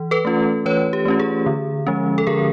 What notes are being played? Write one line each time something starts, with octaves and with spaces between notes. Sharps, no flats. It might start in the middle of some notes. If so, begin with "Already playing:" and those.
Already playing: E3
A4 B4
A3 C#4 F4
E3 B4 C#5
G4
A3 C#4 F4
G#4
D3
F3 G#3 C#4
A4
D3 G#4 A#4